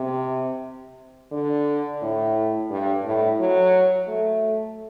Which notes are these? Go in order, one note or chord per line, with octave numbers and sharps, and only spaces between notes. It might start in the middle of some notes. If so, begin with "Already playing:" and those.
Already playing: C3
D3
A2
G2
A2
F#3
A3